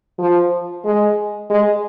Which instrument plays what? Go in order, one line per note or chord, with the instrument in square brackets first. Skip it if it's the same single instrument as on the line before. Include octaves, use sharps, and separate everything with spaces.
[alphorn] F3
G#3
G#3